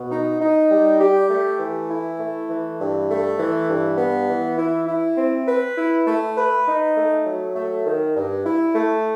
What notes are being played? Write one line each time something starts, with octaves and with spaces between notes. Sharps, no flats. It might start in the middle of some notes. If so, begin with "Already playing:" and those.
Already playing: B2
D#4
D#4
G3
G4
A3
E3
E4
A3
E3
G2
A3
E3
G2
B3
E3
E4
E4
C4
B4
E4
A3
B4
D#4
A3
F#3
A3
D#3
G2
E4
A3